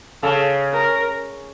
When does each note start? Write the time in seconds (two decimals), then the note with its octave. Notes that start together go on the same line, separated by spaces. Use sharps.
0.23 C#3 A4
0.73 A#4